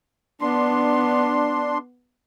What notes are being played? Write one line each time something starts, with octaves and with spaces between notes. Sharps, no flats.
B3 D4 C6